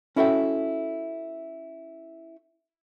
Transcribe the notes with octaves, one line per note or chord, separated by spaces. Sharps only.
C#4 E4 F#4 A4 E5 G5